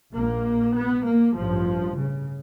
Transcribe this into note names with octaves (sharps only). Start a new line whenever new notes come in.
A#1 A#2 A#3
B3
A#3
A1 G2 F3
C#3